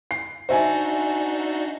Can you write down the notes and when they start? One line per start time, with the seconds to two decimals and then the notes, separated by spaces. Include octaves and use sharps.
0.11 C7
0.49 D4 D#4 F#4 C5 E5 G#5